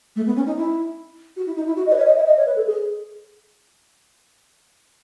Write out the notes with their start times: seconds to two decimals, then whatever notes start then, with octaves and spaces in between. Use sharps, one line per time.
0.15 A3
0.26 B3
0.35 C#4
0.46 D#4
0.56 E4
1.36 F#4
1.46 E4
1.55 D#4
1.66 E4
1.76 F#4
1.86 D#5
1.92 B4
1.96 C#5
2.05 D#5
2.16 E5
2.25 D#5
2.36 C#5
2.46 B4
2.55 A4
2.66 G#4